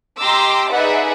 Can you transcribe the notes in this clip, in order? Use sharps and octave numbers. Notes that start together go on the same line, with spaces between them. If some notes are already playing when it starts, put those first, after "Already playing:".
G4 D#5 A#5 C6 D6 E6
D#4 G#4 B4 D5 E5 F#5